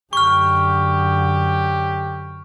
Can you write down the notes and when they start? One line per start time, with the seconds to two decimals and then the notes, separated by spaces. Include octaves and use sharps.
0.13 F#2 D3 G4 C#6 F6